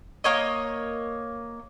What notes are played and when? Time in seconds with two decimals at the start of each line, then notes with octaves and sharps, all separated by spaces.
0.24 A#3 C#5 D#5